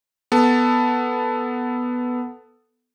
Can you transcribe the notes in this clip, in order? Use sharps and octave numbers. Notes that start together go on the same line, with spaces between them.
B3 A4 A5